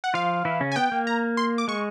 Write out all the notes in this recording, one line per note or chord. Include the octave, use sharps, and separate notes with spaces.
F#5
F3 F4 F5
E3 E4
C#3 C#4
G#5
B3 G5
A#3
A#5
C6
D6
G#3 C#6